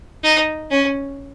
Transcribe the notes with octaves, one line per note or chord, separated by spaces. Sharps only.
D#4
C#4